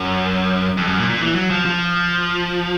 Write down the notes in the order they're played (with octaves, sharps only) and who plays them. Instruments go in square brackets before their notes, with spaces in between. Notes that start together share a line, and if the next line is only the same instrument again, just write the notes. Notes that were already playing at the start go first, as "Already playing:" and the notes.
Already playing: [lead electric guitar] F#2
F2
F#2
A#2
A#2
E3
F#3
F3
F3